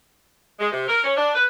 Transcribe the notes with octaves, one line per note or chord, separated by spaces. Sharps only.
G#3
C3
A#4
C#4
D4
B4